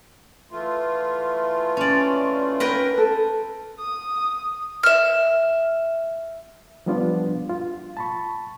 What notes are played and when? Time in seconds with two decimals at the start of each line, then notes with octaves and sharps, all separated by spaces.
0.51 E3 A3 F4
1.77 C#4 D5
2.60 A#4 B4 G5
2.98 A4
3.79 D#6
4.83 E5 F6
6.86 F3 G3 B3 D4 F4
7.49 F4
7.97 A5 B5 C#6